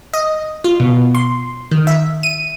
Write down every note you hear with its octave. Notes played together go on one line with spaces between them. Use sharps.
D#5
F4
B2
C6
D#3
E5
D#7